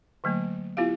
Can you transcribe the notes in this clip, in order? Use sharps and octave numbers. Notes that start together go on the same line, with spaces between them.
D3 F#3 A3 A#3
B3 E4 F4 G4 F5